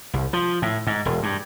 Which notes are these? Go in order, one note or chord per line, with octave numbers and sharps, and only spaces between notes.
C2
F3
A2
G#2
E1
G2